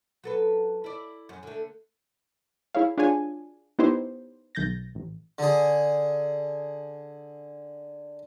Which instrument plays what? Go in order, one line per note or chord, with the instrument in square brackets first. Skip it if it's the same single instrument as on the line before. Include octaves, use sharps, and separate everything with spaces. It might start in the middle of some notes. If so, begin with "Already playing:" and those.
[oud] F#3 A4 B4
E4 D5
F#2
D3 A3
[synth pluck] E4 G#4 C#5 F5
D4 F4 F#4 G#4 C#5 G#5
B3 D#4 E4 G4 C5 C#5
B1 D#3 G6 A6 A#6
A1
[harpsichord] D3 G#4